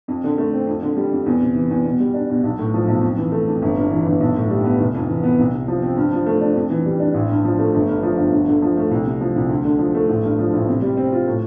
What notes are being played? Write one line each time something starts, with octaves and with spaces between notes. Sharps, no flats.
F2
D3
A3
C4
F2
D3
G3
F2
E2
C3
E3
E2
B2
G3
D4
B2
B1
A2
F3
B1
F2
E3
A3
F2
G1
G2
E3
G1
B1
A2
G3
B3
F1
F2
E3
B3
C2
C3
F3
C4
G2
F3
A3
D4
F2
E3
G3
D4
A1
G2
F3
A3
G1
G2
F3
G1
D2
D3
F3
A3
C2
C3
F3
C2
D2
D3
F3
A3
A1
G2
F3
A1
C3
G3
C4
F4
A2